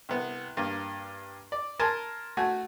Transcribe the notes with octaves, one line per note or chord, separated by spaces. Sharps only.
C2 B3
G2 A#3
D5
A#4 G#5 A5 C6
A3 F#4 G#5